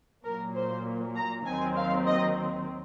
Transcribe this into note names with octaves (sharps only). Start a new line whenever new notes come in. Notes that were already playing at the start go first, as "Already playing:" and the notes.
A#2 F#3 A#3 A#4
C5
A#5
D#2 D#3 F#3 C4 G#5
F5
D#5